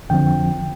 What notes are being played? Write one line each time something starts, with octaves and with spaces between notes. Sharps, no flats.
F2 D3 F3 C4 G5